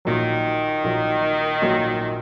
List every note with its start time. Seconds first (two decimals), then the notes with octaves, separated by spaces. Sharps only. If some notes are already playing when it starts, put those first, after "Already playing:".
0.05 A#1 A#2 D#3 F#3
0.84 A#1 A#2 F#3
1.62 A#1 A#2 F#3